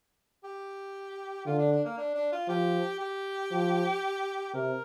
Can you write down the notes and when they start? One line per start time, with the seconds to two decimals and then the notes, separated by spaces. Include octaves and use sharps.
0.44 G4
1.46 D3 F4
1.59 D4
1.71 D4
1.85 A#3
1.97 D4
2.15 D4
2.32 F4
2.48 F3 G4
3.00 G4
3.52 F3
4.54 C3 A#4